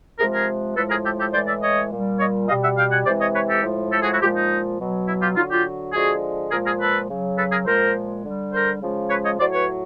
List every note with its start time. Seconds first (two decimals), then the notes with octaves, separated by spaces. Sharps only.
0.18 C3 F3 G#3 G#4 A#4
0.33 G#4 A#4
0.76 A2 F3 G#3 A4 B4
0.90 G#4 A#4
1.05 G4 A4
1.19 G4 A4
1.33 A2 E3 G#3 C5 D5
1.47 D5 E5
1.63 C#5 D#5
1.91 A#2 G3
2.19 C#5 D#5
2.48 B2 G3 D#5 F5
2.63 E5 F#5
2.78 F5 G5
2.91 F#5 G#5
3.05 C3 E3 G#3 C5 D5
3.20 C#5 D#5
3.34 B4 C#5
3.49 G4 A4
3.63 A2 F3 G#3
3.92 G4 A4
4.02 F#4 G#4
4.12 E4 F#4
4.21 A#2 F3 G#3 F4 G4
4.36 D#4
4.79 B2 F#3
5.07 E4
5.22 F4 G4
5.35 D3 F#3 D#4 F4
5.50 F4 G4
5.93 D3 F3 G#3 F#4 G#4
6.51 A#2 F3 G#3 G#4 A#4
6.65 G#4 A#4
6.80 A4 B4
7.09 C#3 F#3
7.38 A4 B4
7.52 G#4 A#4
7.66 A#2 F3 G#3 A#4 C5
8.24 D3 G3
8.53 A#4 C5
8.81 C#3 F3 G#3
9.09 B4 C#5
9.24 C#5 D#5
9.39 A2 F#3 C5 D5
9.52 B4 C#5